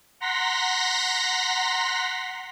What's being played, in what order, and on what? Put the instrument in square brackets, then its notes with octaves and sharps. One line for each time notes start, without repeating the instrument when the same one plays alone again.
[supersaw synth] F#5 A#5 C6 A#6 B6